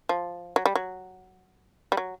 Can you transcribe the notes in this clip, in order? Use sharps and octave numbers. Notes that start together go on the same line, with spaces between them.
F3
F#3
G3
F#3
G3
F#3